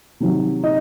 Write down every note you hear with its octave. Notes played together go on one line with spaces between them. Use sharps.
C3 D#3 F#3
D#4 D#5